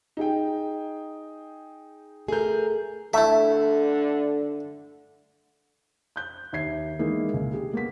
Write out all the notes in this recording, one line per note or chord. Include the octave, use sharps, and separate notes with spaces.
D#4 G#4 G5
A3 G#4 A#4 G6
D3 A3 E4 E5
F#6 G6
D#2 E5 G#6 C7
D#3 E3 G#3 A#3 E4
C#2
G4 G#4
A#3 B3 B6